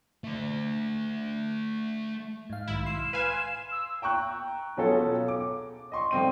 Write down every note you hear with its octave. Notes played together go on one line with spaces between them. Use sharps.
A3 D5
G#2 F5
B1 G#2 D#3 E4
C6 F6 C7 E7
B4 F5 G#5
E6
G5 A#5 C#6 F#6
B2 F#3 C#4 F4 G#4 A4
D6
D#5 C6 C#6
D2 G2 C4 D#7